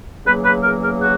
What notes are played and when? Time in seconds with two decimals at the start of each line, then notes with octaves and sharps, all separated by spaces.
0.23 E2 C#3 F#3 A#3 B4
0.43 B4
0.62 A#4
0.81 A#4
1.00 F#4